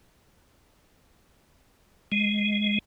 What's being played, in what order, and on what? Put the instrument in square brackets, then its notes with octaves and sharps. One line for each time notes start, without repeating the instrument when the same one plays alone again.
[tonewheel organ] G#3